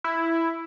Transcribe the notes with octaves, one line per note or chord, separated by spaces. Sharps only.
E4